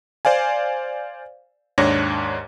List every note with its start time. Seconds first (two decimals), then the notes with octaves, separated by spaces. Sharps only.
0.25 C5 D5 F5 G#5
1.78 D#2 G#2 D4 C#5 A#6